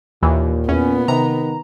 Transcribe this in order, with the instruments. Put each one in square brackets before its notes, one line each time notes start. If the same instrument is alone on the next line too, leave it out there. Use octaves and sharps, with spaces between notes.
[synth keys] D#2 [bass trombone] A#2 [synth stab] E3
[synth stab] E2 [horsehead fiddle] B3 [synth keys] C#4
[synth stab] C3 [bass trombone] D#3 [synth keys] A#5